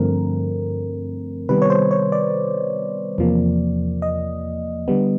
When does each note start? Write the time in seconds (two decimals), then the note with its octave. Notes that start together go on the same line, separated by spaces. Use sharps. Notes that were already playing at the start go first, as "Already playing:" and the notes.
Already playing: G2 D3 F3 A3 C4 A#4
1.49 C3 D#3 G3 B3 B4
1.62 C#5
1.70 C5
1.91 C#5
2.12 D5
3.18 E2 C3 F3 A#3
4.02 D#5
4.88 D3 G3 B3